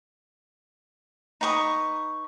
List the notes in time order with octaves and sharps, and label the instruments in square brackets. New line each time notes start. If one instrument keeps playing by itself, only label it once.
[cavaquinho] D#4 B4 C#6 D#6